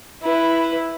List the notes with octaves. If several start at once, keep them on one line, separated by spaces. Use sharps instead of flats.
E4 B4